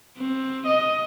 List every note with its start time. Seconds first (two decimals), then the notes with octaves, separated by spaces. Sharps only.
0.18 C4
0.66 D#5